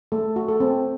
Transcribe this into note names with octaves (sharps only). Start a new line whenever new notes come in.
A3 A4
F#4
A4
C4